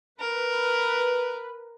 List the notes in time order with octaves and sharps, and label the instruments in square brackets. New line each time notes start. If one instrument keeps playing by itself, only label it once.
[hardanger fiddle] A#4 [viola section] B4